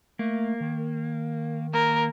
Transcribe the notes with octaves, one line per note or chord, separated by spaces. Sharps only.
A3 A#3
D#3
A#3 A#4